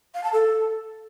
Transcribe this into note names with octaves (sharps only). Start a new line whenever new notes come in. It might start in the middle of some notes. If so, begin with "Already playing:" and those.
F5
A5
A4